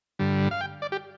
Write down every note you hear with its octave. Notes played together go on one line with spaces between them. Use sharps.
G2 D3 G3
F5
G5
D5
G4